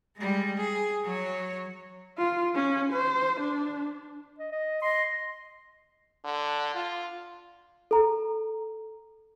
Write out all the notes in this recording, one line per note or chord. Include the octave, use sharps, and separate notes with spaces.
G3 G#3
G#4
F#3 C#5
F4
C#4
C5
D4
D#5
D#5
D#5 C6
D3
F4
A4 A#5